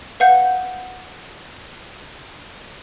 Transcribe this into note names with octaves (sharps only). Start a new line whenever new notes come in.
B4 F5 F#5 G6